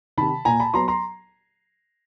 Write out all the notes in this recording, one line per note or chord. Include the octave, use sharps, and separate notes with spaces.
C3 D#3 A5 B5
A#2 G#5 A#5
A5 B5
F#3 B3 A#5 C6
A#5 C6